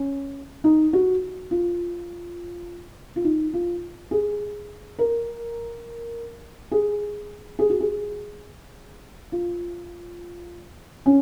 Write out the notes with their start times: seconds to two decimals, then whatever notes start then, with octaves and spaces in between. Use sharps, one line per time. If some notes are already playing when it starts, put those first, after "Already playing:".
Already playing: C#4
0.64 D#4
0.93 F#4
1.51 F4
3.16 F4
3.24 D#4
3.54 F4
4.11 G#4
4.99 A#4
6.71 G#4
7.59 G#4
7.70 F#4
7.80 G#4
9.32 F4
11.06 C#4